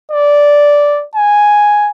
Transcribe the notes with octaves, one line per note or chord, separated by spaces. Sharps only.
D5
G#5